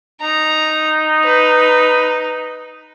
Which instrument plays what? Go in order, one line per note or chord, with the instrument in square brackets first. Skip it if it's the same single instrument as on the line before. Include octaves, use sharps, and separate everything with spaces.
[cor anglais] D#4 [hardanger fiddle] A#5
[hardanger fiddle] B4